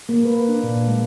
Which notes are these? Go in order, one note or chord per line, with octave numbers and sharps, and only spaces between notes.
A#3
B4
D4
A#2
G#3